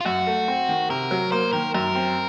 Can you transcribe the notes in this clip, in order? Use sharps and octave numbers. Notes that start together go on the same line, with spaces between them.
F4
F#2 F#4
A3
C4
D#3
C3 A#4
F#3
A#3 C5
D#3 A#4
F#2 A#4
C4